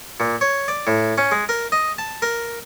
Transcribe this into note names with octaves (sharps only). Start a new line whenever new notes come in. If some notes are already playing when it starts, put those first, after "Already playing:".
A#2
C#5
D5
A2
C#4
G#3
A#4
D#5
A5
A#4